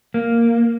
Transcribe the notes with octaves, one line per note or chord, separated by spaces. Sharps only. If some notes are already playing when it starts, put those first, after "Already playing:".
A#3